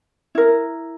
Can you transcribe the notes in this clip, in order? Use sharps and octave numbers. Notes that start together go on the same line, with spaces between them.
E4 A#4